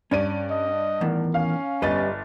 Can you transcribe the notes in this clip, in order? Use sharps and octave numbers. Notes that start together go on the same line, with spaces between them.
G2 C#4 D5 D#7
D#5
E2 A2 D#3
C#4 F5
G1 G3 B4 D#5 A6